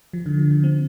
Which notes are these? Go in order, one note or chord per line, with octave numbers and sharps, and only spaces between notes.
F3
D3
F3
D3
C4